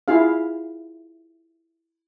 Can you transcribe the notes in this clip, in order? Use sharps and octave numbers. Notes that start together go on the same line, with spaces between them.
E4 F4 G#4 F5